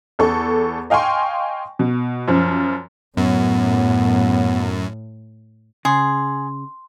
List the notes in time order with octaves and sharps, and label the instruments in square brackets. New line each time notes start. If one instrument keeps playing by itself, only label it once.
[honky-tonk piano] E2 A4 C#6
D#5 F5 G5 G#5 C6 C#6
B2
F#2 F3
[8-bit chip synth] F#2 [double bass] A2 [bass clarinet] B3
[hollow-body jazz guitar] C#3 [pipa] G#4 [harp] C6